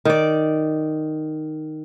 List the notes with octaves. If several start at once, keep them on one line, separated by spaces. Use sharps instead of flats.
D#3 D5